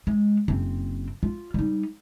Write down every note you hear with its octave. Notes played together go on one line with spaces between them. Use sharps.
G#3
F#1 C4
F4
G3 D#4